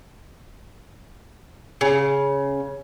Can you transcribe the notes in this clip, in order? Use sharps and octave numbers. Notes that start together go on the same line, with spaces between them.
C#3